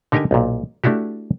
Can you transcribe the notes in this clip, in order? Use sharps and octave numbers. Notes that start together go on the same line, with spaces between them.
D3 D#4 G4 A#4 G5 G#5
B1 A#2
A3 D4 E4 F#4 G4